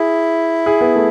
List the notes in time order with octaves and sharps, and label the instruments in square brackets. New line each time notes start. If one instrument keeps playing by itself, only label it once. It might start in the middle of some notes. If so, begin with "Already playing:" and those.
Already playing: [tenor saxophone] E4 [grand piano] G#4
[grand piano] G#4
B3
A3